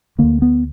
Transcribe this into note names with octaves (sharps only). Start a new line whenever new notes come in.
D2 D3 A#3
B3